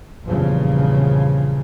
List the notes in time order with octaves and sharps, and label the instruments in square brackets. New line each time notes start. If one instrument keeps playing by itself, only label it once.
[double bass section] A#1 E2 G2 C#3 F3